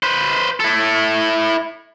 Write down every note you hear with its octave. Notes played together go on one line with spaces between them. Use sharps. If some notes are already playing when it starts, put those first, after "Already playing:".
B4 C5
E4 A4